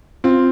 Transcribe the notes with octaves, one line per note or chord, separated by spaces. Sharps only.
C4 F4